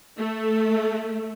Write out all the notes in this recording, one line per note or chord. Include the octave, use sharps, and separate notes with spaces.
A3